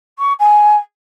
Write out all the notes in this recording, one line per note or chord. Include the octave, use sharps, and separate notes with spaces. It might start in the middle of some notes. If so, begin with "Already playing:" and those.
C#6
G#5